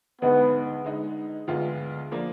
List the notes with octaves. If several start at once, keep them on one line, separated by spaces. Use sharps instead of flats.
D2 D3 G#3 B3 D#4
D3 G#3 D#4
D2 D3 G#3 B3 F4
F3 A#3 D4